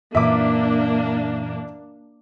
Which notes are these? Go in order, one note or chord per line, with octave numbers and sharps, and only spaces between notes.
F#2 A#2 E3 A#3 D4 E5 D6